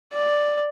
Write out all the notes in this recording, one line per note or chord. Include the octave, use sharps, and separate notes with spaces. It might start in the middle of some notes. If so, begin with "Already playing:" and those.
D5